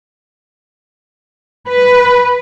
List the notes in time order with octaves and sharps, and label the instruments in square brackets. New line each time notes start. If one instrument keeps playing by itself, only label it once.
[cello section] B4